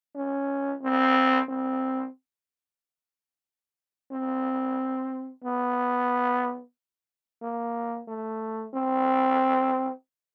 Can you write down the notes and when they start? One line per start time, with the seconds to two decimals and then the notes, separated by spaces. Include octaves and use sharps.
0.16 C#4
0.82 C4
1.49 C4
4.12 C4
5.44 B3
7.42 A#3
8.08 A3
8.74 C4